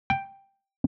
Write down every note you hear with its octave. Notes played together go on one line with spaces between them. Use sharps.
G5